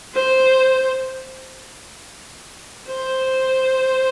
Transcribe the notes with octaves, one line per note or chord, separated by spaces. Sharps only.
C5
C5